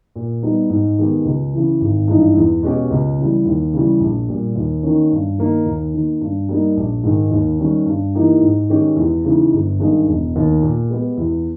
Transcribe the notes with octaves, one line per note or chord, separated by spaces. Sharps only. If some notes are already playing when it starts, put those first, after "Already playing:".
A#2
G3 B3 D#4
G#2
D#3 G#3 B3 G4
C#2
C#3 E3
G#1
G2 E3 G#3 D#4
E2
B2 G#3 C#4 G4
C#2
C#3 E3 G3
D#2
C#3 E3 G3
A#1
A#2 G3
D#2
D#3 A#3 C#4
G2
D#3 A#3 D#4 A#4
D#2
D#3 A#3
G2
G3 A#3 D#4
A#1
G#2 D#3 G#3
D#2
D#3 G3 C#4
G2
E3 A#3 D#4 G4
G#2
D#3 G#3 C#4 G4
E2
C#3 E3 G#3 D#4
G1
G2 D#3 G#3
E1
D#2 D#3
A#2
G#3 B3 G4
E2